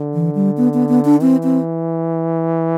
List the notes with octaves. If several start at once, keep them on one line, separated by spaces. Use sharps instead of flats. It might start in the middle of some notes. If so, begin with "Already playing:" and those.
Already playing: D3
E3
G3
B3
B3
B3
D4
E3 C4
C4